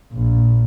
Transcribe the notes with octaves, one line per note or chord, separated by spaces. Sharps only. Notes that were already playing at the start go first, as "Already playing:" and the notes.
A#1